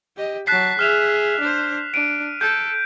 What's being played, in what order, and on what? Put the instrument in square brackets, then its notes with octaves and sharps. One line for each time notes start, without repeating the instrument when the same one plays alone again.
[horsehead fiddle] G4 D#5
[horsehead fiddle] F#3 A5 [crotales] F#6 B6 C7
[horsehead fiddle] G#4 E5 [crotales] F6 E7 F7
[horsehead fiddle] D4 C5
[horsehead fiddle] D4 [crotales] D7 D#7
[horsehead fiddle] A4 [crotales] G6